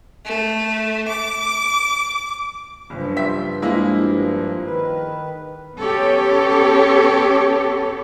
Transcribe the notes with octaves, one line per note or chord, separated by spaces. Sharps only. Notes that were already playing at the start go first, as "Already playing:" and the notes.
A3
D6
F#1 G2 F3
C5 E5 B6
G#3 A#3 E4
D#3 B4
B3 C#4 G4 A4 C#5